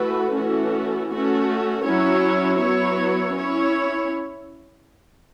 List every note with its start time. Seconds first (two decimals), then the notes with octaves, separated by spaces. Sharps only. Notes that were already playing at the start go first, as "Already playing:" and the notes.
Already playing: E3 A3 F#4 B4
0.35 E3 A3 C#4 F#4
1.11 A3 C#4 F#4
1.84 F#3 C#4 E4 C#5
2.59 F#3 B3 E4 C#5
3.34 C#4 E4 C#5